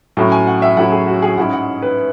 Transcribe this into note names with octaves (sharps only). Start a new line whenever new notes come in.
A2 F#3 C#4 E4
G#5
F#5
E5
A2 F#3 C#4 E4 F#5
G#4
F#4
G#4
G#2 G#3 C#4 E4 F#5
F#5
B4